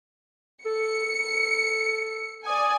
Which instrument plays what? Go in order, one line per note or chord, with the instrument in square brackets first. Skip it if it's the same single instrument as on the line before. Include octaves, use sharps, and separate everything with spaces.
[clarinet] A4 [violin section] C#7
[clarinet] A4
[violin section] D5 G#5 [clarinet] D#6